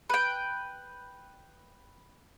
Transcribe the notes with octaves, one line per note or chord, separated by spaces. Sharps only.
B4 G5